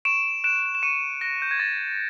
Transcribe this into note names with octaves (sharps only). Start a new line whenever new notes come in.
C#6 D7 E7
F#6 D7 E7
E7
C#6 C#7 D#7
F#6 A#6
G6
G#6
C#6 A6